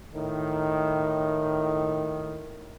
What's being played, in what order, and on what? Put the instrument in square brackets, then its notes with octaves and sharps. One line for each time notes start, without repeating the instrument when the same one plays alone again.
[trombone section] A2 D#3